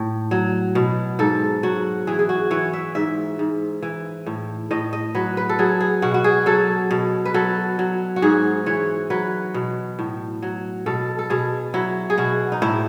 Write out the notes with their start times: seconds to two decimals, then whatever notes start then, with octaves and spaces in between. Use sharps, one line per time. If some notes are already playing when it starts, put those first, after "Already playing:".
Already playing: A2
0.31 F#3
0.75 B2
1.19 G#2 A4
1.63 F#3 F#4
2.07 E3 G#4
2.19 G#4
2.29 F#4
2.51 E3 C#5
2.73 E5
2.95 G#2 E5
3.39 G#2
3.82 E3
4.26 A2
4.71 A2 D#5
4.93 D#5
5.15 F#3 B4
5.37 B4
5.49 A4
5.59 F#3 G#4
5.80 G#4
6.02 B2 F#4
6.14 F#4
6.24 G#4
6.46 F#3 A4
6.91 B2
7.25 B4
7.34 F#3 A4
7.79 F#3
8.16 F#4
8.22 G#2 G#4
8.66 E3 C#5
9.10 F#3 B4
9.54 B2
9.99 A2
10.43 F#3
10.86 B2 A4
11.19 A4
11.30 B2 G#4
11.74 F#3 E4
12.10 G#4
12.18 B2 F#4
12.52 D#4
12.62 A2 E4